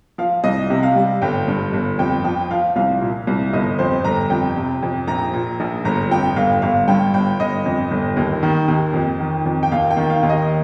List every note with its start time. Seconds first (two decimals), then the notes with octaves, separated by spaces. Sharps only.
0.18 F3 F5
0.44 C2 D#5
0.70 C3
0.83 F5
0.95 G3
1.22 G1 G5
1.48 G2
1.73 G1
1.98 F2 G5
2.24 F3 G5
2.51 F3 F5
2.76 C2 F5
3.01 A#2
3.27 C2
3.53 G1 D#5
3.79 F2 C5
4.04 G1 A#5
4.30 F2 G5
4.56 C3
4.82 F2
5.07 A#1 A#5
5.33 A#2
5.60 A#1
5.85 G1 A#5
6.11 F2 G5
6.36 G1 F5
6.62 G1 F5
6.88 G2 G5
7.14 G1 G5
7.39 G1 D#5
7.66 F2
7.91 G1
8.17 D#2
8.43 D#3
8.68 D#2
8.94 F2
9.20 D#3
9.45 F2
9.63 G5
9.72 D#2 F5
9.91 G5
9.97 D#3
10.10 F5
10.23 D#2
10.29 D#5